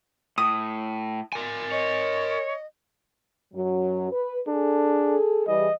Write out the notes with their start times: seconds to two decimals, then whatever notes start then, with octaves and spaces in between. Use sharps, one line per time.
0.38 A2 D#6
1.33 A#4 G#5
1.72 C#5 D#5
3.54 F#2 F#3
4.12 B4
4.47 D4 G#4 A4
5.47 E3 G3 G#4 D#5